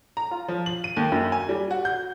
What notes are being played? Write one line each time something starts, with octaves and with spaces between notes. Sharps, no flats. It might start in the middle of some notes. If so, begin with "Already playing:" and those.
A#5
F4
F3
F#7
D#7
D#2
F#2
G#5
G3
F#4
G6